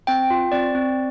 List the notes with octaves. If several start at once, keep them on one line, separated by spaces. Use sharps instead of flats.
C4 G5
F4
C4 D5
C4